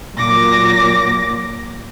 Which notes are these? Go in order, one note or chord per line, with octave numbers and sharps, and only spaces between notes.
A#2 F#3 D6 A#6